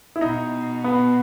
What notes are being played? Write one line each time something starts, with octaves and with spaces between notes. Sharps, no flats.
E4
B2 D#4
B3